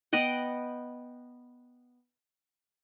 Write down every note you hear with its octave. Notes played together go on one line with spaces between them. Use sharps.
B3 D#5 F#5 G5